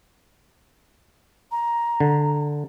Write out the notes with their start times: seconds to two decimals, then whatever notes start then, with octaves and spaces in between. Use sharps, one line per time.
1.51 A#5
2.00 D3